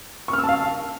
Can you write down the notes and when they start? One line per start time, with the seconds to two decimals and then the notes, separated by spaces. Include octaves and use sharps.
0.28 C#6
0.33 F6
0.38 E6
0.44 A5
0.49 F5